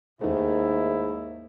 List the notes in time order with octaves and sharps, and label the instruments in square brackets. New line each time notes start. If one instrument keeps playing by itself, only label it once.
[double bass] D#2 [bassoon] G#2 [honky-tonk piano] D#3 A3 [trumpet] E4